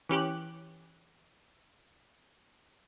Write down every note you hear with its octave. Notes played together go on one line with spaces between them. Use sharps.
E3 C#4 G4 F#6